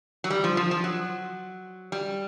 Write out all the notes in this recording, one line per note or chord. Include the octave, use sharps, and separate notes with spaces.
F#3
G3
F3
F3
F3
F#3
G3